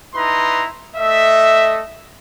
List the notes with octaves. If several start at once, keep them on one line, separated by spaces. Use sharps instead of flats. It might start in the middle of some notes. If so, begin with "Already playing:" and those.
D#4 E4 B4 A#5 C6
A3 A4 D#5 E5